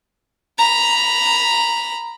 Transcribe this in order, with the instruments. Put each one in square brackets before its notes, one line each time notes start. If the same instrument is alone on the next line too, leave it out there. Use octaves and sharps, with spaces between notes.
[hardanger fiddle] A#5 B5